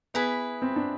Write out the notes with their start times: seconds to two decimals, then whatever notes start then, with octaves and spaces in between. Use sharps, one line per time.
0.14 B3 E4 G#4 B4
0.62 C4
0.76 D4